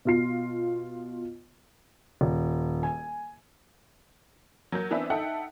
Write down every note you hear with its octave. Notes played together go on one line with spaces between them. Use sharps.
B2 F4 C7
D#1
G#5
F#3 A#3 A#4 G6
E3 B3 C4 D4 B4 E5
D#4 A4 E5 F#5 G5